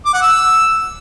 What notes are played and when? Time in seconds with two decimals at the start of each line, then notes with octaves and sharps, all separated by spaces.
0.05 D6
0.14 F#5
0.22 E6